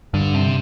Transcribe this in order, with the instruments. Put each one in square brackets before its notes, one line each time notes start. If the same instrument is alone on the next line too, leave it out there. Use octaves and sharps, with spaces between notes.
[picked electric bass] G2 [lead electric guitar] D3
[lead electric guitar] C3